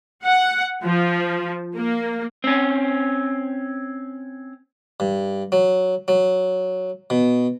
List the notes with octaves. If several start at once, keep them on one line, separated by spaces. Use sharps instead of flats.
F#5
F3
A#3
C4 C#4
G2
F#3
F#3
B2